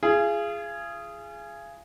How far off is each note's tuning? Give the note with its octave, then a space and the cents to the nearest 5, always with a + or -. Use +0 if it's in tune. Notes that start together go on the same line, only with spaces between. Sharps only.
F4 -35 G#4 +0